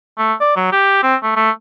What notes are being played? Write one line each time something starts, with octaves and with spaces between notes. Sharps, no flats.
A3
D5
F#3
G4
C4
A3
A3